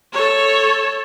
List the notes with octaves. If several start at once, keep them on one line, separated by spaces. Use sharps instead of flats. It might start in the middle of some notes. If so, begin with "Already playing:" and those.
A4 C#5